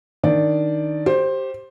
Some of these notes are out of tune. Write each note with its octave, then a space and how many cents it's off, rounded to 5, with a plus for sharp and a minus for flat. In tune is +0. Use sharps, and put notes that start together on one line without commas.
D#3 +0 D4 +0 D5 +0
G4 -10 C5 +15